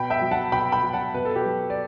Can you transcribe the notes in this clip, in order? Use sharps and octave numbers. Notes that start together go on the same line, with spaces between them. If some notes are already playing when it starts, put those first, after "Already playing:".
Already playing: B2 G5 B5
E5 G5
F#3
F#5 A5
B2 G5 B5
G5 B5
F#3
F#5 A5
B2 B4
A4
G4 B4
F#3
D5